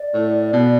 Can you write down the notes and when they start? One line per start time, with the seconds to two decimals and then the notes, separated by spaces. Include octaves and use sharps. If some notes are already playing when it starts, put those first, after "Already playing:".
Already playing: D5
0.14 A2
0.53 B2